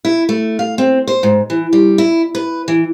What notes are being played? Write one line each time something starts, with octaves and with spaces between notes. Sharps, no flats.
E4
A3
F5
C4
C5
G#2
E3
G3
E4
B4
E3